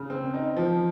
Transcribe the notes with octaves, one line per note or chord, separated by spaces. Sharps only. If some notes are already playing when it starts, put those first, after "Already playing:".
Already playing: C#3
C4
D#4
F3